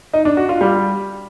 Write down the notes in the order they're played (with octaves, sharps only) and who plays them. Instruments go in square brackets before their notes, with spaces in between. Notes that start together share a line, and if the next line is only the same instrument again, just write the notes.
[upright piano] D#4
D4
F#4
F4
G3